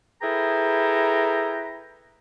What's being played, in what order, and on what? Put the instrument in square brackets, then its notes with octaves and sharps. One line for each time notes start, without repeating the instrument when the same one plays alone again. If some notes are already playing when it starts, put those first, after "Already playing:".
[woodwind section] E4 G#4 A4 B4 G5 A#5